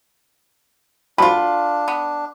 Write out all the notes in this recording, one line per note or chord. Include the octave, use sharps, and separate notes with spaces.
D3 D4 F4 B5
B3